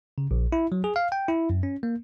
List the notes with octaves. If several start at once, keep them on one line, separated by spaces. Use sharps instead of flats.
C#3
A#1
E4
F#3
G#4
F5
G5
E4
F#2
C#4
A#3